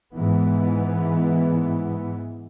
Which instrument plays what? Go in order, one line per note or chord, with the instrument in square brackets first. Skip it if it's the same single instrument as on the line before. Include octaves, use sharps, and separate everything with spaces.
[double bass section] G#2 E3 B3